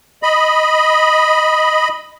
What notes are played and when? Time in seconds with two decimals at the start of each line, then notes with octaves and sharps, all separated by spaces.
0.23 D#5 B5